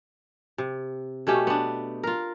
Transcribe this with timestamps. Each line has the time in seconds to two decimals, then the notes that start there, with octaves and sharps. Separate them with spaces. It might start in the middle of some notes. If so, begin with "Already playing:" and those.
0.58 C3
1.27 B2 A3 C#4 G4
1.47 B3 D4
2.04 F4 A#4